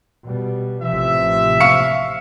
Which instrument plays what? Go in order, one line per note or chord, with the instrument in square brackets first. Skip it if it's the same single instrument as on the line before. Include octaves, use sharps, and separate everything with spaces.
[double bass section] B2 G3
[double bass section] A1 C3 F3 [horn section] E5
[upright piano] F5 C#6 C#7